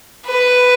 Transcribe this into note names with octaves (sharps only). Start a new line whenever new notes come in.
B4